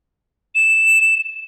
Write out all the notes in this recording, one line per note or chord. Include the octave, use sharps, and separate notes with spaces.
E7